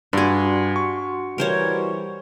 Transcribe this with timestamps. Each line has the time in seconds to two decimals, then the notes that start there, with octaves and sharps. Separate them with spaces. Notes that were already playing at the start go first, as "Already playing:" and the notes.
0.13 G2 D4 F#4 G#4 F#5 C6
0.76 C#6
1.38 E3 G3 A#4 C5 C#5